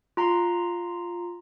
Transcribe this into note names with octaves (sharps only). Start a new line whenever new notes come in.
F4 A#5 C6